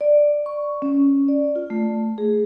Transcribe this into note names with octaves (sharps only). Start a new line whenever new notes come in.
D5
C#6
C#4
D5
F4
A3
G#4